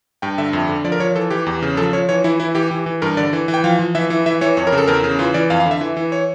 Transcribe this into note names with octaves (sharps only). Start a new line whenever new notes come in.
G2 G5
D3 E5
F2
D3
F3 D5
A#4
F3 C#5
E3 A4
E3 G4
E2
C#3
F3 A4
F3 C#5
E3 C#5
E3 E4
E3 E4
E3 G4
E3
E3
G2 A#4
D3 D5
E3
E3
G5
F3 F5
F3
E3 E5
E3
E3 E5
E3 C#5
F2 C#5
A#4
C#3
A4
E2 A#4
C#3
E3 F4
E3 D5
F2 F5
F5
D3
E5
E3
E3
C#5